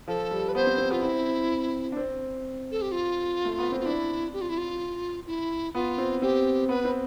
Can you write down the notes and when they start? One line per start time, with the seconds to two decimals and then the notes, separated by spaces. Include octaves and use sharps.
0.07 F3 A4
0.31 G3
0.49 B4
0.55 B3 C5
0.67 C4
0.78 C4
0.90 B3 F4
1.02 C4 E4
1.92 D4
1.97 C4
2.71 A4
2.82 G4
2.92 F4
3.45 A3
3.58 B3
3.72 C4
3.80 F4
3.85 D4 E4
4.33 G4
4.41 F4
4.49 E4
4.58 F4
5.27 E4
5.75 B3 F4
5.98 C4
6.22 C4 G4
6.69 B3 B4
6.85 C4